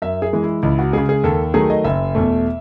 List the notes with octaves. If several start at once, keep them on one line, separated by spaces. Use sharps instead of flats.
F#2 E5
G#4
E3 G#3
E4
C#2 E4
F#4
C#3 G#3 G#4
G#4
D#2 A4
D#3 F#3 A3 G#4
D#5
F#1 E5
E2 B2 A3